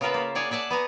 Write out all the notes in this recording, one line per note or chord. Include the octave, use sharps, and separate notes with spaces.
C#3 B3 F4 A#4 B4 E5
A#3
G#4 C#5 D5 F#5
G#4 D5 E5 F#5 A5
B3 G#5 A#5